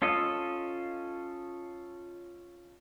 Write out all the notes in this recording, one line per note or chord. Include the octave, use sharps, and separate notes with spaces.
C#4 F4 A4 D#5